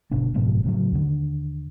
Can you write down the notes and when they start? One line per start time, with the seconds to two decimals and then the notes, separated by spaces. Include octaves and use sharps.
0.11 G1 B2 D4
0.34 F#1 G#2 B2 F3
0.63 A2 C#3 F#3
0.92 D#2 D3